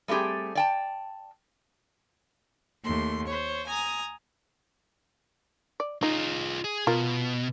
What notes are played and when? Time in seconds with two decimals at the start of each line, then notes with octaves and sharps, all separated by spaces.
0.08 G3 A3 C4 G4 G#4
0.55 D5 G5 A5
2.84 D#2 A3 C6
3.26 C5 C#5
3.66 G#5 A#5 D#6
5.80 D5
6.03 D#4 F4 G#4
6.64 G#4
6.87 B2 F4 A#4